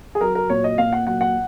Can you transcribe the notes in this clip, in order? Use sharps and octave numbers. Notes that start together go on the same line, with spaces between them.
G#4
F#3 A#4
A#4
A#2 C#5
D#5
A#2 F5
F#5
F#3 F#5
F#5